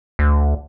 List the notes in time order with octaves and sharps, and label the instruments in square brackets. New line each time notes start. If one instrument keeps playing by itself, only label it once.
[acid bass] D2